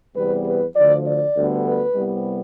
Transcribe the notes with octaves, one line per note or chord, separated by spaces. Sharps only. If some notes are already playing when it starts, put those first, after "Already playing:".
E2 C3 G3 B3 B4
B4
D2 D3 F3 D5
D5
D2 D3 G3 B3
B4
C2 C3 G3 B3